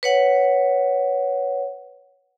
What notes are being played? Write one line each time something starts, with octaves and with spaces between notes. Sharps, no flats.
B4 C#5 F#5